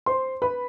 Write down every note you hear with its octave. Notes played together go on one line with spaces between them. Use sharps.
C5 C6
B4 B5